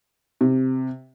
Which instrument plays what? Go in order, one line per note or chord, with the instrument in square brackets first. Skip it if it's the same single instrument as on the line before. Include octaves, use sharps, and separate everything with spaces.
[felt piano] C3